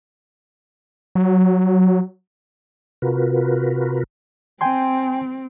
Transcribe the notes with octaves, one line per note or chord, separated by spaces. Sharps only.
F#3
C3 F4 F#4 A#4 B4
C4 G5 G#5 C6